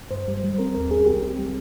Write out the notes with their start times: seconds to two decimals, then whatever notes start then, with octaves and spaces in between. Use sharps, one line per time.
0.11 G2 C5
0.28 G3
0.44 G3
0.58 C4 A#4
0.74 D#2 A#4
0.91 C4 G#4
1.06 C2 G4
1.22 C4
1.38 G3